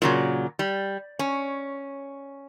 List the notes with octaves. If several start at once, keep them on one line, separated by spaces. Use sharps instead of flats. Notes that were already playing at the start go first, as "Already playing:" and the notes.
A#2 C#3 F#3
G3
C#4